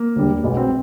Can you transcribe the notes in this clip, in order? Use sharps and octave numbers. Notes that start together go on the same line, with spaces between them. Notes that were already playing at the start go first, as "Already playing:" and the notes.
Already playing: A#3
E1 D2 D3 G3
B1 B2 G#3 B3
C4